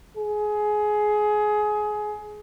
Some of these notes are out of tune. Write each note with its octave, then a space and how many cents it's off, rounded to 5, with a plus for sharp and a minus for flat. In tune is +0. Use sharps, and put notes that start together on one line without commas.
G#4 +20